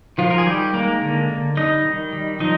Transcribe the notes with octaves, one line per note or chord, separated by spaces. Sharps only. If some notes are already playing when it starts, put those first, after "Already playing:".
D#3 F3 F4
A#4
G#4
D#3 G3 G4
G#3 A#3 A#4
D3
D3
G3 D#4 D#5
D#3
G3
F3 D#4 D#5